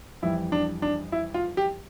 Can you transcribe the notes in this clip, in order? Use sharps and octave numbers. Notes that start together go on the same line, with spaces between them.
F2 E3 G3 E4
D4
D4
E4
F4
G4